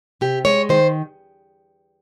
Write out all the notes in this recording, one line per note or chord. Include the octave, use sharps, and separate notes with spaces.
C3 G4
G#3 C#5
D#3 C5